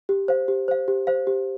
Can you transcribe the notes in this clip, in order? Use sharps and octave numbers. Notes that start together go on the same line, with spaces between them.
G4
C5 F5
G4
C5 F5
G4
C5 F5
G4